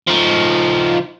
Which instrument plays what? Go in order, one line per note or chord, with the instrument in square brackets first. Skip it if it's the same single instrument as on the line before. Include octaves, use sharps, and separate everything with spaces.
[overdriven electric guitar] F3 D#4